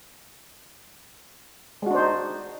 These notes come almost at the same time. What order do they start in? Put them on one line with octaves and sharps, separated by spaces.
G#3 F#4 D4 C5 D#4